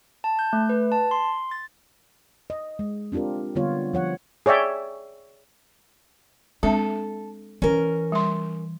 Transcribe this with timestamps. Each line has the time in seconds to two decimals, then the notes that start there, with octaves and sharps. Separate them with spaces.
0.24 A5
0.39 G6
0.53 A3
0.69 B4
0.92 A5
1.11 C6
1.51 A6
2.50 D#5
2.79 G#3
3.12 C4 D4 F4 G4 A#4
3.55 D3 G3 B3 F4 C#5
3.93 F3 C#5 F#5
4.46 G#4 C#5 D5 E5 G5
6.63 G#3 C4 D4 A4 E5
7.62 E3 C#4 A#4
8.12 G3 C6